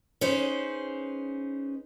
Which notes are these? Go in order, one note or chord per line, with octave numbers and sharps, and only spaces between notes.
C#4 D#4 G#4 B4 C5